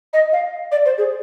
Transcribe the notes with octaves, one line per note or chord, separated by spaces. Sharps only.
D#5
F5
D5
C5
G#4